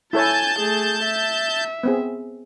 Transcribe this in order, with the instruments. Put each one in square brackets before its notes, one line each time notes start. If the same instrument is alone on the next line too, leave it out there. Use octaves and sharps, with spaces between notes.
[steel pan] E4 A4 C#5 [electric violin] G#5 A6 [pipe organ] A5 G6
[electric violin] A3 G#4
E5
[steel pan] B3 C4 G#4